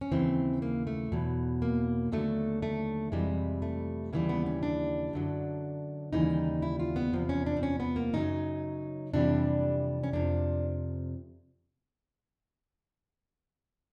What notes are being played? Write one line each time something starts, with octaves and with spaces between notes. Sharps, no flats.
C#4
D#2 C#3 E3 C4
A#3
A3
E2 B2 F#3
A#3
D#2 D3 F#3 A3
A3
F2 C3 E3 G3 G#3
A3
D#2 C#3 E3 G3 A#3
B3
C#4
D4
F#2 D3 F#3
D#2 C#3 E3 G3 D#4
E4
F4
B3
E2 C3 F3
C#4
D4
C4
C#4
B3
A#3
F#2 C#3 F#3 D#4
F2 C3 E3 G3 D4
C#4
F2 C3 F3 D4